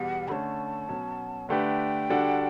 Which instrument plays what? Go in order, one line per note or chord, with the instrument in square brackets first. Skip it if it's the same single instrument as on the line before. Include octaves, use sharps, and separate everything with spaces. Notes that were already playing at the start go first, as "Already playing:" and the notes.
Already playing: [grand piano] E2 B2 G3 [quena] F#5
[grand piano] D3 A3 C#4 [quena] A5 B5
[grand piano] B2 F#3 C#4
[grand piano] D3 A3 D4 G4 B4 [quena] G5
[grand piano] D3 G3 D4 F#4 A4